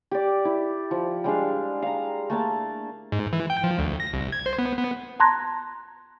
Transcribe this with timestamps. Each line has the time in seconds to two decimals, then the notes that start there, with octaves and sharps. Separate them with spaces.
0.11 G4 D5
0.45 E4
0.91 F3
1.24 G3 G#3 D4 F5
1.82 F5 A#5
2.30 A3 A#3 A5
3.12 G#2
3.33 E3
3.50 G5
3.64 F3
3.79 D2
4.00 A#6
4.13 C2
4.32 G#6
4.46 C5
4.58 B3
4.77 B3
5.20 A5 A#5 C6 F#6 G#6 A#6